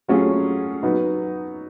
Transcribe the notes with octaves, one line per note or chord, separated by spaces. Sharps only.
F#3 A3 C#4 F4 G#4
F#3 B3 D#4